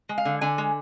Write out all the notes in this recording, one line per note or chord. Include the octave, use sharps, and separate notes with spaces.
G#3
F5
D3
D3 G#5
G#3